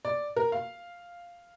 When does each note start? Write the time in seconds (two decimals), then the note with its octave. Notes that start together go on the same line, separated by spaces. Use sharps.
0.05 D5
0.36 A#4
0.52 F5